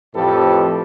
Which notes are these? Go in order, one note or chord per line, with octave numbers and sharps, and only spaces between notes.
F2 A2 F3 G4 A4 B4